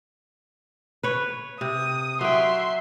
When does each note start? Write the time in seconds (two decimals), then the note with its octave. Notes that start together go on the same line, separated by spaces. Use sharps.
1.03 B4 C#5
1.61 C3 D#6
2.21 F#3 E5 G5 C6